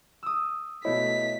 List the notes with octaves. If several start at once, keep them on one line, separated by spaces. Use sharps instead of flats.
D#6 E6
B2 A3 E4 C#5 D#5 B6